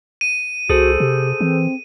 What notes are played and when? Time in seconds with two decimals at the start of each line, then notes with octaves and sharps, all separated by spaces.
0.21 D#7
0.70 C2 F#4 G#4 A4 C5
1.00 C3 G4
1.41 E3 C4